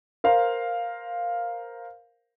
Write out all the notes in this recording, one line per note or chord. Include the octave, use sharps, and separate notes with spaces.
A#4 C5 F5